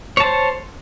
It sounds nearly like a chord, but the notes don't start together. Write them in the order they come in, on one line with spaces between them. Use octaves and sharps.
C#5 A5 C5